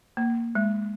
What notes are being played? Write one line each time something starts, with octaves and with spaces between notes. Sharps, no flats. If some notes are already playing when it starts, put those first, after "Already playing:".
A#3
G#3